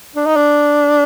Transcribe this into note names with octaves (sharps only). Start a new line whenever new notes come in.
D4
D#4
D4